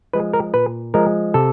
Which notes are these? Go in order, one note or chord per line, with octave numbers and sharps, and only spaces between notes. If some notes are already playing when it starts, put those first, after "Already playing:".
F3 G#3 B4
A#4
A#2 B4
F3 G#3 A#4
C3 A4